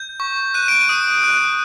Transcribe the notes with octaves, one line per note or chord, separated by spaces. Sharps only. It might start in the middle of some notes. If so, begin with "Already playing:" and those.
Already playing: G6
C#6
F#6 D#7
D7
D#7
D#6
F#6